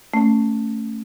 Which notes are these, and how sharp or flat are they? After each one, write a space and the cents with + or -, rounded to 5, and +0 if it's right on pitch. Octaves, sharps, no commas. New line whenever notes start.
A3 +15 C#4 +0